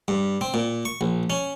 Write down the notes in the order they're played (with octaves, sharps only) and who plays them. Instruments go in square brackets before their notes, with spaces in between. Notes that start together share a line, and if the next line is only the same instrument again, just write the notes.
[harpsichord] G2
C4
A#2
C#6
A#1
C#4